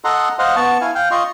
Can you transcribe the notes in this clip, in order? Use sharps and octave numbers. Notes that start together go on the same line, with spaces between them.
A4 D#5 F#5 A#5 C6
C5 D#5 F5 F#5
B3 A5 C#6
E4 F5 G#5
F5 G5
F4 D#5 C6 C#6